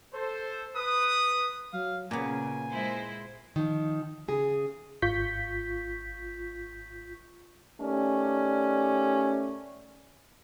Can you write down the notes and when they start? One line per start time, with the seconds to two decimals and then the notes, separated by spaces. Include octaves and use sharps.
0.14 A4 C5
0.77 B4 D#6
1.73 F#3 F5
2.11 A#2 C#3 A#3 B3 G#5
2.70 G#3 E4 C5
3.56 D#3 F3
4.28 C#3 G#4
5.02 G#1 F4 C#6 G6 B6
7.81 D#3 A3 C#4 G4 D5